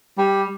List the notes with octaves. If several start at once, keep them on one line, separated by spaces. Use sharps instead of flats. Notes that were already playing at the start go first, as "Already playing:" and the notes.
G3